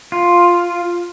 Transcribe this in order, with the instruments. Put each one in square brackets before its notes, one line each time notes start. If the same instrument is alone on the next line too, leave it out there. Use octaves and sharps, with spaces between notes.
[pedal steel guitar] F4